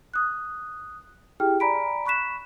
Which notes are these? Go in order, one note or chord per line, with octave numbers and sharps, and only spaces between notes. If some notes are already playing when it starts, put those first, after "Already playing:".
D#6 F#6
E4 G4 G#4 G5 F6
D5 G#5 A#5 B5 B6 D7
B5 C#6 F#6 B6 E7